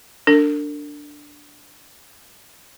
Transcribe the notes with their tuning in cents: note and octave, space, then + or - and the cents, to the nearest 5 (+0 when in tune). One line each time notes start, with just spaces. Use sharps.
D4 +0 A#4 -45